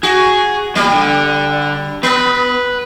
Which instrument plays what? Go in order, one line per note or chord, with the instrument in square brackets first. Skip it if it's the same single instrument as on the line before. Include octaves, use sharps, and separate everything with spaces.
[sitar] F#4 [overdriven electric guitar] G#4
[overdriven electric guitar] E2 A#2 [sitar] G3
[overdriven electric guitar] D3
[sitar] B3 [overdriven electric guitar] B4